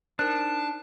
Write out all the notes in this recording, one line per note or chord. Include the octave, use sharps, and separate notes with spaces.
D4 D#4 A#4 C5 A5 F#6